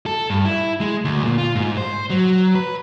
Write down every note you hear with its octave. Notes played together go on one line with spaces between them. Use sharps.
A4
G2
E4
G#3
D2
A#2
F4
G#2
C5
F#3
B4